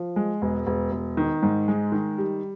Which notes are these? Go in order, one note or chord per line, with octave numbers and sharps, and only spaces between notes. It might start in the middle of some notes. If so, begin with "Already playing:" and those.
Already playing: F3
G#3
E1
E1
E1
D#3
G#2
G#3
D#3
G3